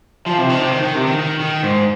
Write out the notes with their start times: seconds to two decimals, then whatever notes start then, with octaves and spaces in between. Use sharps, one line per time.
0.26 F3
0.38 C3
0.49 D#3
0.61 C3
0.72 D#3
0.83 D#3
0.95 C3
1.06 D#3
1.18 D#3
1.40 D#3
1.63 G#2